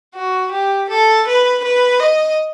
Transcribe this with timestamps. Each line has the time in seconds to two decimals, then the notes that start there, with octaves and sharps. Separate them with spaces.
0.14 F#4
0.52 G4
0.89 A4
1.27 B4
1.64 B4
2.00 D#5